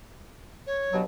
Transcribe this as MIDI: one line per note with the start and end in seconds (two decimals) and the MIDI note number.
0.66 0.96 73
0.93 1.02 43
0.93 1.02 47
0.93 1.02 54